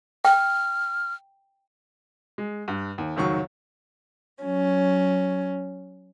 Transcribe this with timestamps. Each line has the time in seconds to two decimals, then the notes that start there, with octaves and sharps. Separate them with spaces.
0.25 G5 F6
2.38 G#3
2.68 G2
2.98 D#2
3.16 F1 C#2 D#3 F#3 C#6
4.43 F#3 C#4